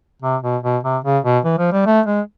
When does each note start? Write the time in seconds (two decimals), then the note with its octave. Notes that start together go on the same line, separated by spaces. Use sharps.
0.22 C3
0.43 B2
0.63 B2
0.83 C3
1.04 C#3
1.24 B2
1.45 E3
1.58 F3
1.72 G3
1.86 A3
2.06 G#3